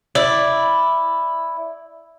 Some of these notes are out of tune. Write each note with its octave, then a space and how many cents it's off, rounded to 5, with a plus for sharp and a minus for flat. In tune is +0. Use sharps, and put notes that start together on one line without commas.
E4 +0 D5 +0